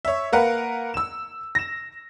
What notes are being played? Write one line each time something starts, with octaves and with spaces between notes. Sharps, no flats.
C#5 E5
A#3 A#4 B4 F5 F#5
E6 E7
A#6 E7